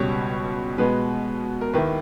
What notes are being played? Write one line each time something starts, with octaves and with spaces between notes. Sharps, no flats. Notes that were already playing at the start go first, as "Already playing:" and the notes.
Already playing: C#2 B2 G3 C#5
B2 G#3 B3 B4
A#4
D#2 D#3 A#3 E4 B4